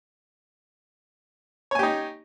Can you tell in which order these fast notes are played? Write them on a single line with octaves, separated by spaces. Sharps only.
C#5 G#5 G4 D#4